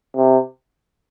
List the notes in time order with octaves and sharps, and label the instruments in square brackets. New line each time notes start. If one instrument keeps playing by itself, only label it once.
[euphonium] C3